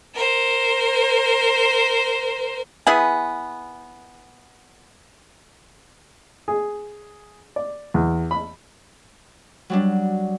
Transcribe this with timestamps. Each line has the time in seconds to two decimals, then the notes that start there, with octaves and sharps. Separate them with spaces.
0.14 A#4 C5
2.87 B3 E4 G#4 G#5
6.48 G#4
7.56 D5
7.94 E2
8.31 B5
9.70 F#3 G3 D4